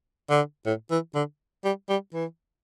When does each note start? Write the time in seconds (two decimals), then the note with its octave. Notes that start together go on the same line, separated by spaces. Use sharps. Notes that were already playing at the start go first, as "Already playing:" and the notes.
0.30 D3
0.66 A2
0.91 E3
1.15 D3
1.64 G3
1.89 G3
2.14 E3